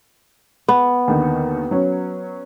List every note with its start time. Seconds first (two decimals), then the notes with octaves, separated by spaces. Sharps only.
0.68 B3
1.08 D#2 D3 D#3
1.71 F#3 C#4